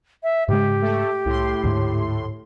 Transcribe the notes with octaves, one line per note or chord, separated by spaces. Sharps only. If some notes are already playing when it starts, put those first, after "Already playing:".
E5
G#2 C#3 G#3 G4
A3
C2 A2 C6
D2 G#2